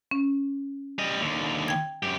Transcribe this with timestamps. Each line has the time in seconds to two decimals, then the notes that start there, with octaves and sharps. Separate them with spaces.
0.11 C#4
0.98 G3 D#5
1.21 D#2 D3
1.68 G5 G#6
2.03 F#2 G4